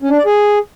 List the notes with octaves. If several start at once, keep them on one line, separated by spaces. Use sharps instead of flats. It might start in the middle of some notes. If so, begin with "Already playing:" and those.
C#4
D4
D5
G#4